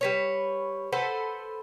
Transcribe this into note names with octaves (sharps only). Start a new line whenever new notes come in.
G3 B4 C#5
A4 B4 C5 F#5